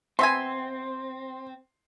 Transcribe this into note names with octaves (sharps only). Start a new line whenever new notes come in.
B2 C4 E5 G#5 C6